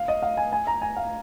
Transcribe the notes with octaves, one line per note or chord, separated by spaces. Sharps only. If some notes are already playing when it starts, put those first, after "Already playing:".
Already playing: F5
D#5
F5
G#5
G#5
A#5
G#5
F5